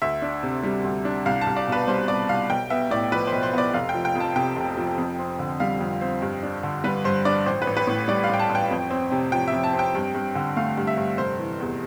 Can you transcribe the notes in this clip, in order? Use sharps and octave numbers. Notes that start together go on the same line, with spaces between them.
D2 E5
D4
C3
G3
D2
D4
C2 F5
A5
C2
D5
B2 B4
G3 C5
C2 D5
C2 F5
B1 G5
B3 E5
A2 D5
F3 B4
B1 C5
C5
B3 D5
F1 F5
G5
F3
G5
F2
A5
C3 G5
F1
F3
F2
C4
D3
G3 F5
F2
C4
G2
D4
D3
G3 B4
G2 C5
D4 D5
A1 C5
B4
A1
B4
A2
G3 D5
F5
A1 G5
A5
A1
G5
F2
C4
C3
F3 G5
E5
F2
A5
C4
G5
G2
G2
D3
A3 F5
G2
E5
G2
F1 C5
E3
E2